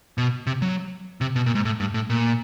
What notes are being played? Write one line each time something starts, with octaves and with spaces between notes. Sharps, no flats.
B2
C3
F#3
C3
B2
A#2
G#2
A2
G2
A2
A#2